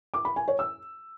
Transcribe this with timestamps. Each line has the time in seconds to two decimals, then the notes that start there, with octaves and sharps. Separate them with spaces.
0.14 D6
0.25 B5
0.36 G#5
0.48 C#5
0.59 E6